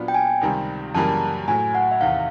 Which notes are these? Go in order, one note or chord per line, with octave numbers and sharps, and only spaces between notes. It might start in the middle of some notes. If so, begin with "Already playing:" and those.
Already playing: A#2 F#3 B3 D4 F4
G5
G#5
C#2 C3 D#3 G3 C4
F#2 C#3 E3 G3 A#3 A5
A2 F#3 A3 G#5
F#5
E5
E2 C3 D#3 F5